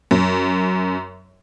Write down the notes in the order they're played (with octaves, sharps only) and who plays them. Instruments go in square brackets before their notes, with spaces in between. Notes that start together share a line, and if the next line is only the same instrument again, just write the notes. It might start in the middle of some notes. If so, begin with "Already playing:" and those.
[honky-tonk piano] F#2